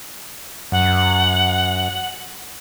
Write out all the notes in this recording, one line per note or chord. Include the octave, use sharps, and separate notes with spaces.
F#2 F#5